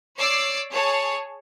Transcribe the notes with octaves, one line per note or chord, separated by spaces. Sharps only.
C#5 D5 D6 E6 C7
G#4 C#5 A5